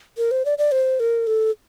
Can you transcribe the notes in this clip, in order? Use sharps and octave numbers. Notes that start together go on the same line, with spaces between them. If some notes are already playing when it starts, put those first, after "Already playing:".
A#4
C5
D5
D5
C5
A#4
A4